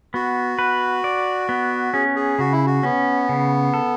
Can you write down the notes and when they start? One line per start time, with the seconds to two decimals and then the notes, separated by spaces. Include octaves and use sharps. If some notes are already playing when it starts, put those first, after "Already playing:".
0.14 B3 F#4
0.59 B4
1.04 D5
1.49 B3
1.94 C#4 G#4
2.16 G#4
2.39 C#3 F#4
2.52 E4
2.66 F#4
2.83 B3 C#4
3.29 C#3
3.74 A4